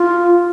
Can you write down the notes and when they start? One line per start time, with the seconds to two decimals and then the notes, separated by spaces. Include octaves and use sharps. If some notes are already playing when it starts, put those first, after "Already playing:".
Already playing: F4